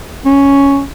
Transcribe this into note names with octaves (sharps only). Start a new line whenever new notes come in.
C#4